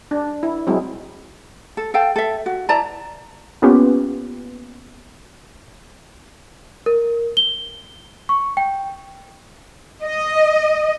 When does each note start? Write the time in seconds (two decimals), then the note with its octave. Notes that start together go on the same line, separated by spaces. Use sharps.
0.11 D4
0.43 E4
0.67 F#3 G#3 C4 E4
1.77 A4
1.94 A4 F5 G5 A5
2.16 A4 E5
2.46 F#4
2.69 E4 D5 A5 A#5
3.62 A#3 B3 C#4 F4 G4 B4
6.86 A#4
7.37 G7
8.29 C#6
8.57 G5
10.03 D#5